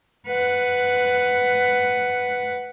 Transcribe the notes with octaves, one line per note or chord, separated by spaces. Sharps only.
B4 F#5